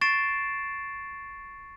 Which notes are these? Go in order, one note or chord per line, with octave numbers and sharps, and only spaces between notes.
C#6 A6 C7 D7 E7